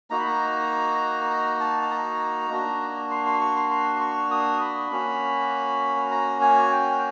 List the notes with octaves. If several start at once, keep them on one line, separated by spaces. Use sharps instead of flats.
A#3 D#4 F#4 A#5
B5
A#5
A#5
A5
A5
A#5
A#3 D4 F#4
C6
C6
C#6
C6
C6
C#6
D#6
B5
A#3 C#4 F#4
A#5
G#5
G5